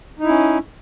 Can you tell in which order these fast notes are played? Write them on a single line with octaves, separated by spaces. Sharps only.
D#4 E4 C#4